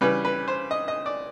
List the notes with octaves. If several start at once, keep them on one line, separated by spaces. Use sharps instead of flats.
C#3 E3 G3 B4
B4
C5
D#5
D#5
D5